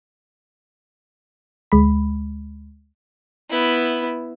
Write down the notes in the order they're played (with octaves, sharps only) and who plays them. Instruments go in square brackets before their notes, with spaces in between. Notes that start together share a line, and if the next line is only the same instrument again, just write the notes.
[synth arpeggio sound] D2 G#3 B5
[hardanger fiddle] B3 E4